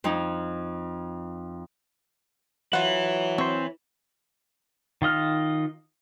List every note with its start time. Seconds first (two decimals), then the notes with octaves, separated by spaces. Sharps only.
0.04 F2 D#4
2.73 F#3 E4 F4 B4 F#5
3.38 C4 C5 C#5
5.02 D#3 F4 D#5 F6